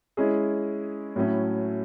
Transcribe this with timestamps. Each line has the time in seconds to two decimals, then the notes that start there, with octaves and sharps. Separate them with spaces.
0.17 G#3 C#4 E4 G#4
1.16 A2 F#3 A3 C#4 E4